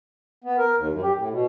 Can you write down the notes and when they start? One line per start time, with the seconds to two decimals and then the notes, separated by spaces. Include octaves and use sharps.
0.44 B3
0.58 A#4
0.77 D#2
0.91 F#2
1.03 G4
1.16 A2
1.31 B2